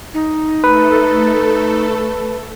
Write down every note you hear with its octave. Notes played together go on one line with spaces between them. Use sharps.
D#4
A3 A4 B4